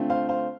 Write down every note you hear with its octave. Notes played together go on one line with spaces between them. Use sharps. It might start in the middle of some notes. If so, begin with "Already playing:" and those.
Already playing: D3 A3 C4 F4
C5 F5
C5 F5